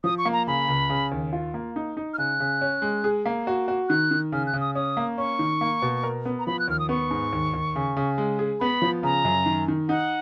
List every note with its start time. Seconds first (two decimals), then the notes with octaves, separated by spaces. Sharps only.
0.04 F3 D#6
0.18 C#6
0.25 A#3
0.33 A#5
0.47 C#3 B5
0.68 C#2
0.90 C#3
1.12 D#2
1.33 F4
1.54 A#3
1.76 D#4
1.97 D#4
2.14 F6
2.18 C#3 F#6
2.40 C#3
2.61 C#4
2.82 G#3
3.04 G#4
3.26 A#3
3.47 F#4
3.68 F#4
3.89 D#3 F#6
4.11 D#3
4.32 C#3 F6
4.47 F#6
4.53 C#3
4.61 D#6
4.75 C#4 D#6
4.97 A#3
5.18 C#4 C#6
5.39 D#3
5.61 A#3
5.82 B2
6.03 A#4
6.25 B3
6.39 A#5
6.47 F3 B5
6.59 F#6
6.68 D#2 F6
6.79 D#6
6.89 B3 C#6
7.11 G#2
7.33 D#2
7.54 D#2
7.76 C#3
7.97 C#3
8.18 G#3
8.39 G#4
8.60 B3 B5
8.82 F3
9.03 C#3 A#5
9.25 F#2
9.46 D#3
9.68 D#3
9.89 D#4 F#5